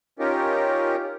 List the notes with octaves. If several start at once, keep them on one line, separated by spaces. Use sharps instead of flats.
C#4 D#4 F4 G4 A#4